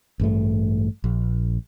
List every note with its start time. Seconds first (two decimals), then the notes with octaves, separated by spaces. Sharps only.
0.20 A1 G2 A3
1.04 A#1